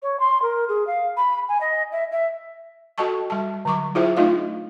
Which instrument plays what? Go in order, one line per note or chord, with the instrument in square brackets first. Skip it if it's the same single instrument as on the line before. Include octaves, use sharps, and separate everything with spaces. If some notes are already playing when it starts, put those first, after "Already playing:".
[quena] C#5
C6
A#4
G#4
F5
B5
G#5
D#5
E5
E5
[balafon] F#4 A4 D#5 G5 A5 C#6
G3 A5
D3 F#3 C#6 D6
E4 F4 G#4 C5 E5 G5
A3 D4 D#4 F4 D#5 F5